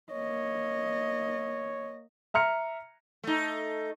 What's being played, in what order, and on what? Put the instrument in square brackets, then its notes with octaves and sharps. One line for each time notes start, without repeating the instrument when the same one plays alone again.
[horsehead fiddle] A#3 D#5 [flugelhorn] C#5
[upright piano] E5 A#5 F6 C#7
[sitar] A3 D#4